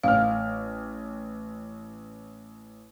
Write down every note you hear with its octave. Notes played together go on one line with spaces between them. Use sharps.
A1 F5 F6